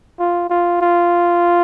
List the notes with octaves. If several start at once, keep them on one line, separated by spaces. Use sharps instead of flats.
F4
F4
F4